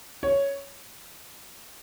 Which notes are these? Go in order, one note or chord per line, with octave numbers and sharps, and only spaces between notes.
C#5